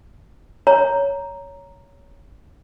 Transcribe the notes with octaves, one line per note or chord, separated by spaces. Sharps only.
C#5 A#5